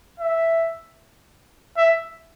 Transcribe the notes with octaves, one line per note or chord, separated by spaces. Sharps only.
E5
E5